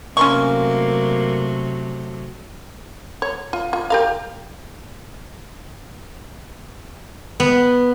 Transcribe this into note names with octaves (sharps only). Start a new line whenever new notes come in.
C3 F#3 A3 A#3 C#4 C6 C#6
C#5
F4
F4
G4 A#4 F5
B3